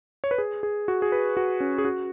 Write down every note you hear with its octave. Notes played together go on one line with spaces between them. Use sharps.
C#5
B4
G#4
G#4
F#4
G#4
B4
F#4
C#4
G#4
F#4